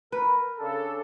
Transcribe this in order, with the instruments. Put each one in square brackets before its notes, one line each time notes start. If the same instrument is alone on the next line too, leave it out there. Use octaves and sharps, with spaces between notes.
[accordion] A#4 [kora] B4
[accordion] C#3 D4 [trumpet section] A4